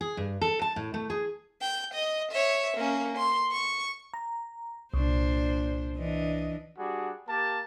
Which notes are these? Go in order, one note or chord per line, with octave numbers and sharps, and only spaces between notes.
G#4
G2
A4
A5
A2
A3
G#4
G5
D#5
C#5 E5
A#3 C#4
C6
C#6
A#5
C2 A#2 D4 C5
E3 D4 D#5
G3 D4 F#4 G#4
A#3 G4 A#4 A5